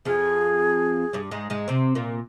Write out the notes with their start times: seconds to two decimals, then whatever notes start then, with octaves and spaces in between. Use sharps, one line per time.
0.05 F2 F3 G#4
1.13 G2 G3
1.31 G#2 G#3
1.50 G#2 G#3
1.68 C3 C4
1.95 A#2 A#3